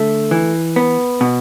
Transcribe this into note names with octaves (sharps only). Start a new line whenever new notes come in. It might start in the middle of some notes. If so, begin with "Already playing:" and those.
Already playing: D3 A3
E3
B3
B2